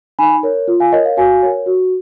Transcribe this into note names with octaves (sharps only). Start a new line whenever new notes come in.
D#4 G#5 B5
A#4 C#5
F4
F5 G#5
A#4 C#5 D#5
F5
F#4 F5 G#5
A#4 C#5
F#4